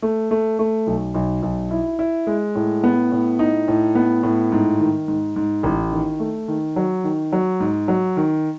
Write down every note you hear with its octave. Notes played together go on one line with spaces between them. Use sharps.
A3
A3
A3
B1
B1
B1
E4
E4
G#3
A2
B3
A2
D#4
A2
B3
A2
G#2
D#3
G#2
G#2
A1
D#3
A3
D#3
F#3
D#3
F#3
G#2
F#3
D#3